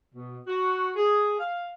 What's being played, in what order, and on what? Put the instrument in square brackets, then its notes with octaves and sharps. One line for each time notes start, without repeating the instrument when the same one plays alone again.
[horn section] B2
F#4
G#4
F5